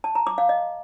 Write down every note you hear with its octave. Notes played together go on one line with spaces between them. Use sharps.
A5
A#5
D6
F5
D#5